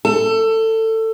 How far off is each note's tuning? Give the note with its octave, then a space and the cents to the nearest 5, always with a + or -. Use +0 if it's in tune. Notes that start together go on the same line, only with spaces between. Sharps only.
A4 +20